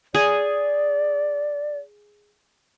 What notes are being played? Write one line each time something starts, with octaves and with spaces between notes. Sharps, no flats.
G#4 D5